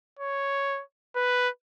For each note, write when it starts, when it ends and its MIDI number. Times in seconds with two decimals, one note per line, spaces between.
0.19 0.82 73
1.16 1.49 71